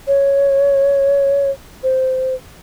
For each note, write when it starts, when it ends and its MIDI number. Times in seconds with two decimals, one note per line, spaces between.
0.07 1.50 73
1.83 2.34 72